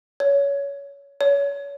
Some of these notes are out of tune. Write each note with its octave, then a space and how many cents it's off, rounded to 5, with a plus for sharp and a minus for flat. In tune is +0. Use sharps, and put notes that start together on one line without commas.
C#5 +20
C#5 +30